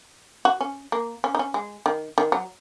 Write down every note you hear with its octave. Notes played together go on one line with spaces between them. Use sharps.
F#4
C#4
A#3
C#4
D#4
C#4
G#3
D#3
D#3
F#3